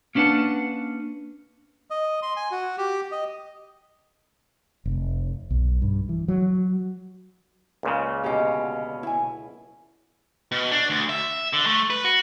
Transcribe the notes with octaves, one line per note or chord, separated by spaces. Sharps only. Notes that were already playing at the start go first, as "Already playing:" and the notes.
A#3 C#4 D4 B4 F#5 A5
D#5
C6
G#5
F#4
G4
D#5
F1
B1
G2
E3
F#3
C#2 A#2 C#3
B2 D3 C#4 G4 D#5
E4 G#5
B2
D4
D2
E5
D3
A3
B4
F#4